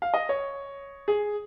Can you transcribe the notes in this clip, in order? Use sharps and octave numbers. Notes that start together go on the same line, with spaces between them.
F5
D#5
C#5
G#4